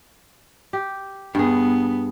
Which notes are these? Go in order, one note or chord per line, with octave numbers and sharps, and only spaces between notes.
G4
G2 B3 G#4